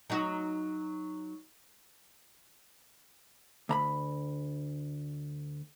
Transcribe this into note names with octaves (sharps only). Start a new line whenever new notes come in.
F#3 D#4 F#4
D2 A#5 B5